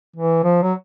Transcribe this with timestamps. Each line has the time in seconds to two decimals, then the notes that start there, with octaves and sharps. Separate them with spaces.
0.16 E3
0.44 F3
0.62 F#3